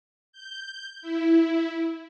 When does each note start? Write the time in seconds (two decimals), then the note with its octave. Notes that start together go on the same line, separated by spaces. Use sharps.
0.32 G6
1.02 E4